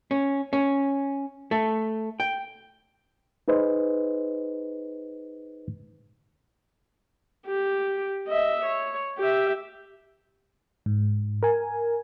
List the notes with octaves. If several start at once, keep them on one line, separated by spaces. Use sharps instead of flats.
C#4
C#4
A3
G5
D#4 G#4 B4 C5 D#5
G4
D#5 E5
C#5
G4 E5
G#2
A#4 G#5